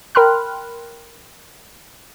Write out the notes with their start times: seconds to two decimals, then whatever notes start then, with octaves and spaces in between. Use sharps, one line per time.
0.15 A#4 G5 B5 C6 F6 F#6